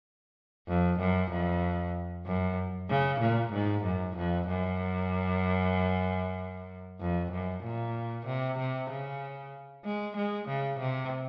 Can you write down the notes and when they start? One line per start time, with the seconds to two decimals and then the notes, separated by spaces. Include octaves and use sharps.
0.68 F2
0.99 F#2
1.31 F2
2.26 F#2
2.90 C#3
3.21 A#2
3.53 G#2
3.84 F#2
4.16 F2
4.48 F#2
7.01 F2
7.32 F#2
7.63 A#2
8.26 C3
8.59 C3
8.90 C#3
9.85 G#3
10.17 G#3
10.48 C#3
10.80 C3